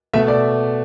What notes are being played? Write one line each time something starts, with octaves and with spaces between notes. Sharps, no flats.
B2 A3 E5
D5